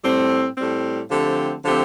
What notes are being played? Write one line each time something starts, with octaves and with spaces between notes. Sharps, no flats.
A2 G3 C4
A2 G3 C4
D3 F3 A3 C4 G4
D3 F3 A3 C4 G4